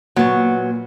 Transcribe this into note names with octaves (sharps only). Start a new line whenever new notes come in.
A#2 F#3 B3